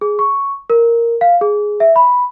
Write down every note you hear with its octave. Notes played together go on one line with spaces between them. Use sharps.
G#4
C#6
A#4
F5
G#4
E5
B5